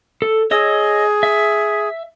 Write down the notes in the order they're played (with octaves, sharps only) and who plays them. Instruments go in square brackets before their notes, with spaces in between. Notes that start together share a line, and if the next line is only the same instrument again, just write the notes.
[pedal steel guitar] A4
[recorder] G#4 [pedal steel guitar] C#5 D#5 E6
[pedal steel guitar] E5